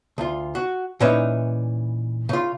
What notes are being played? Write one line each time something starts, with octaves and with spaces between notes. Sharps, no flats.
D2 F4
F#4
A#2 E3 C#4 D#4 B4 E5
C#3 F4